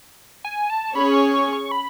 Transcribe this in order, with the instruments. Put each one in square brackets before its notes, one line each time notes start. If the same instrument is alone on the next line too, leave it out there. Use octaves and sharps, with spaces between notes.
[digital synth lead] G#5
A5
[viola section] C#4 G#4 C#5 [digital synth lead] B5
[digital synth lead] C#6
C#6
C#6
B5